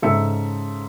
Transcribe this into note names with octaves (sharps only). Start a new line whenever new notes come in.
G#2 C#3 A4 E5 E6 C#7